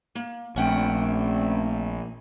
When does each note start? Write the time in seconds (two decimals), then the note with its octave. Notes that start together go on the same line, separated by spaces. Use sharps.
0.15 A#3
0.56 A#1 A3 C4 C#4 F#5 G5